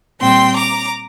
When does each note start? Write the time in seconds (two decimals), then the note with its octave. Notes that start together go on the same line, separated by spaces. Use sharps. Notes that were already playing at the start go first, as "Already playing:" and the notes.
0.20 A#2 G3 C4 G5 C6
0.55 A#5 D6